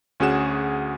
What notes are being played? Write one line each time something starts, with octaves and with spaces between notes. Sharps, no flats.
D2 C#4 F#4 G#4 F#5 E7